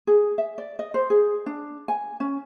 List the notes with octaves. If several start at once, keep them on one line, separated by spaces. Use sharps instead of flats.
G#4
E5
D5
D#5
C5
G#4
D4
G#5
C#4